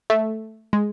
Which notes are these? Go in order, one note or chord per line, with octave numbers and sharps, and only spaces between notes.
A3
G#3